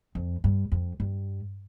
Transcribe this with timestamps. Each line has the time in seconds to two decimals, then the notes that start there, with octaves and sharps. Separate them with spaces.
0.15 F2
0.44 G2
0.72 F2
1.00 G2